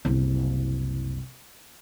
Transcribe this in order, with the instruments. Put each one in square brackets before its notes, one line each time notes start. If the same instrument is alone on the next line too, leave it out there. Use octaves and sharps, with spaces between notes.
[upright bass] F#1 C2